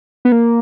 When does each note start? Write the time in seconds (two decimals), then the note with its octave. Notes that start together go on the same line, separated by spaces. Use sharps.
0.25 B3
0.32 A#3